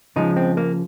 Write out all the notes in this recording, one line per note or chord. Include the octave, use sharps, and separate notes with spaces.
C#3 F3 G#3 D#4
C4
A#3